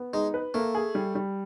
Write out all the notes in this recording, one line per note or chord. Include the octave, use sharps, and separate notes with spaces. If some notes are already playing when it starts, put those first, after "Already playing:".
Already playing: B3
G#3 D#4
B4
A3 A#3
G#4
G3
G3